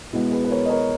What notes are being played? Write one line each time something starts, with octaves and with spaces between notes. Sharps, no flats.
B2 G#3 B3 E4
G#4 B4
B4
A#4 C#5
D#5
A#4 C#5